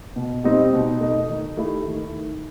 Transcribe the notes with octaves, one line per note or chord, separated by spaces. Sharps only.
B2
G3 C4 D#4 G4
B2
A3 D#4
D#3
A3 E4 G4
D#3